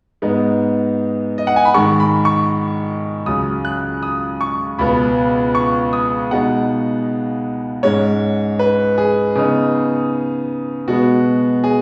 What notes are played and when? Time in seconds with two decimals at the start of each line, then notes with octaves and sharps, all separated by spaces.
0.22 G#2 G#3 B3 D#4
1.38 D#5
1.47 F#5
1.56 G#5
1.65 B5
1.74 G#2 D#3 G#3 C#6
2.00 B5
2.25 C#6
3.26 C#2 C#3 F#3 D#6
3.65 F#6
4.03 D#6
4.41 C#6
4.79 C#2 B2 B3 B5
5.55 C#6
5.93 D#6
6.31 B2 G#3 D#4 F#5
7.83 G#2 G#3 C#4 C#5
8.59 B4
8.98 G#4
9.35 C#3 B3 D#4
10.88 B2 G#3 B3 F#4
11.64 G#4